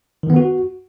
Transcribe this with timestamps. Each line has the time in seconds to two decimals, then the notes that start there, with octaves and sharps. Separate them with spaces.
0.23 D#3
0.30 B3
0.36 F#4